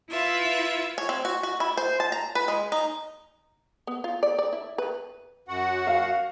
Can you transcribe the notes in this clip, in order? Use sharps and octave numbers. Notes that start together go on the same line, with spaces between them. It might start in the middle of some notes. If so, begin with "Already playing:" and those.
E4 F4 B4 E5
C#5
C4
F#4
F#4
E4
C5
A5
A#5
B4
G#3
D#4
B3
F4
D5
D5
E4
B4
F#2 F#4 F#5
F5